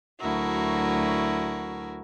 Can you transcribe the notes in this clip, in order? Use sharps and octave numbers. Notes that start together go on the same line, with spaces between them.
D2 F#3 E4 F#4 A#4